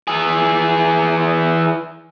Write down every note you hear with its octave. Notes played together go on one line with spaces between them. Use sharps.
E3 G#4